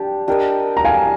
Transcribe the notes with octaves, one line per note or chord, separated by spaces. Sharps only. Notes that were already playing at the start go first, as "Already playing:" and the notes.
Already playing: D4 G4 G5
D4 G4 A#4 D#5
A#5
F5 G#5